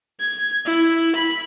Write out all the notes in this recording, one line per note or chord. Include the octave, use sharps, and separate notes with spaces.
G#6
E4
B5